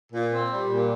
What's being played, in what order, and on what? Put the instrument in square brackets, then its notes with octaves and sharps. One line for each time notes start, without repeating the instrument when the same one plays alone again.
[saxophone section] A#2
C4
G3
A#2